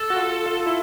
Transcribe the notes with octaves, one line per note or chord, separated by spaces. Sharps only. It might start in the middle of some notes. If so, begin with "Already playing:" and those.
Already playing: A4
F#4
F4
F4
E4